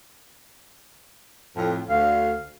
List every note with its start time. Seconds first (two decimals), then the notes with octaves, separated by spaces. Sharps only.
1.56 F2 A2
1.90 D2 F5